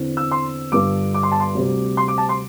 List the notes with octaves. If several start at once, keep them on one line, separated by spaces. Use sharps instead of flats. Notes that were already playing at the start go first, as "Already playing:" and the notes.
Already playing: E2 D3 C4
E6
C6
G1 G2 D3 D6
D6
C6
A5
C6
D2 C3 G3 C4
C6
D6
A5
C6